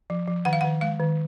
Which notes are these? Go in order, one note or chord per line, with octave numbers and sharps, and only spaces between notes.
F3
F3
D#3 F#5
F5
D#3 F#5
G#3 F5
D#3